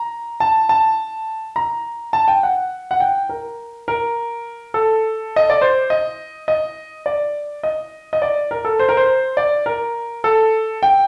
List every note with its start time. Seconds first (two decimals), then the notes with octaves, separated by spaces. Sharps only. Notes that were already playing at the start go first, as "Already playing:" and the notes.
Already playing: A#5
0.40 A5
0.69 A5
1.56 A#5
2.13 A5
2.28 G5
2.43 F#5
2.91 F#5
3.00 G5
3.29 A#4
3.88 A#4
4.74 A4
5.36 D#5
5.50 D5
5.61 C5
5.90 D#5
6.48 D#5
7.06 D5
7.63 D#5
8.13 D#5
8.22 D5
8.51 A#4
8.65 A4
8.79 C5
8.89 A#4
8.97 C5
9.37 D5
9.66 A#4
10.24 A4
10.83 G5